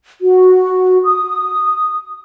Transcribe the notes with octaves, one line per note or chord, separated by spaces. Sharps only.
F#4
D#6